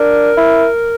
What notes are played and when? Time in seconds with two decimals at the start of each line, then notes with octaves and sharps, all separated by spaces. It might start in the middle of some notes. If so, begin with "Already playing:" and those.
Already playing: D4 A#4
0.37 E4